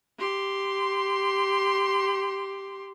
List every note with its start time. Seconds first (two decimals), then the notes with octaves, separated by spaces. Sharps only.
0.18 G4 C6